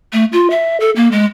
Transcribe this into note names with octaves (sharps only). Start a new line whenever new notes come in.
A3
F4
E5
A4
A#3
G#3